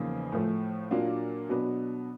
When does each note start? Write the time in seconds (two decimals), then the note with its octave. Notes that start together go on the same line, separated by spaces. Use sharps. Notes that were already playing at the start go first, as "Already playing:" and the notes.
Already playing: E2 C#3 F3 A#3 D#4
0.32 A2 F3 A3
0.91 A#2 F#3 A#3 D4 F4
1.49 B2 F#3 B3 D4